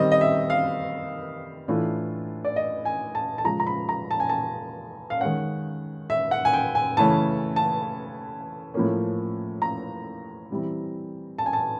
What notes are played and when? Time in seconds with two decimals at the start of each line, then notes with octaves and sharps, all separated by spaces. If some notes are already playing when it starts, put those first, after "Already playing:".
Already playing: D#3 G3 C4 D#5
0.12 D#5
0.21 E5
0.50 F5
1.68 A2 E3 A3 D4 F4
2.45 D5
2.56 D#5
2.85 G#5
3.15 A5
3.38 A5
3.44 C#3 F3 G#3 A#5
3.60 A#5
3.67 B5
3.89 A#5
4.11 A5
4.20 G#5
4.29 A5
5.10 F5
5.20 D#3 G#3 C#4 F#5
6.10 E5
6.31 F#5
6.45 G#5
6.53 G5
6.75 G#5
6.97 C#3 E3 A3 C#4 A5
7.56 A5
8.74 A2 F3 A#3 C#4
9.62 A#5
10.51 E3 G3 C4 E4
11.38 A5
11.46 G#5
11.53 A5